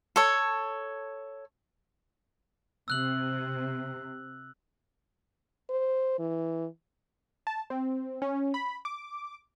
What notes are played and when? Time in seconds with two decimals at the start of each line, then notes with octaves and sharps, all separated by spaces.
0.16 A4 C#5
2.88 C3 E6 F#6 F#7
5.70 C5
6.19 E3
7.47 A5
7.70 C4
8.22 C#4
8.54 B5
8.85 D6